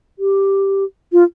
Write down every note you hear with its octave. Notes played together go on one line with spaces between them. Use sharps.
G4
F4